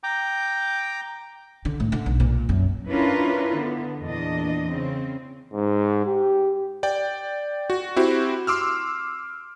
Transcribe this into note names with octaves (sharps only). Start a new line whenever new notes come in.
G5 A#5 D6
D3
A2
D3
B1
A#2
F#2
C#4 D4 E4 F4 A#4 B4
D3 B3
E2 A#2 D4 D#5
C#3 C4
G#2
G4
D5 G5
F#4
C4 E4 F#4 G4
C6 D6 E6 F6